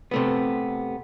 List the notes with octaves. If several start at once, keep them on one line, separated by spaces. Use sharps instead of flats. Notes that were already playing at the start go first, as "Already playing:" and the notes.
C3 A3 B3